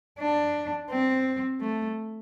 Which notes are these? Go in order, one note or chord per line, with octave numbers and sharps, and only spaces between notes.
D4
C4
A3